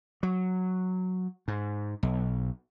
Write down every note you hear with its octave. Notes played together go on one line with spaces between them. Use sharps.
F#3
G#2
B1